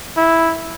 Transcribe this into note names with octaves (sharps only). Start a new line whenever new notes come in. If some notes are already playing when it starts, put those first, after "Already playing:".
E4